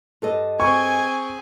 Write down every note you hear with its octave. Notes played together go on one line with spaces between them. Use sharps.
G2 A4 D#5
C4 G#4 G#5 C#6